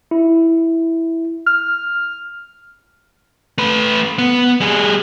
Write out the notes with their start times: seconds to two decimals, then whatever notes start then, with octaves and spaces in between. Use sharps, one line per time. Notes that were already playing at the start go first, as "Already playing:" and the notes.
0.11 E4
1.46 F6
3.58 A3 B4
4.18 B3
4.60 G3 G#4